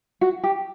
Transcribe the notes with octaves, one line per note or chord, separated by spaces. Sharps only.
F#4
G4